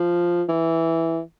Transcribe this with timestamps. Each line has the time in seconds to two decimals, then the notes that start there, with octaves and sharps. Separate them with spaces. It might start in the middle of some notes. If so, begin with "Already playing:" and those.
Already playing: F3
0.49 E3